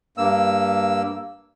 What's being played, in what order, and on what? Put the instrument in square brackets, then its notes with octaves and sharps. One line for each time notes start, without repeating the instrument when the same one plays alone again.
[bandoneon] G2 A#3 E6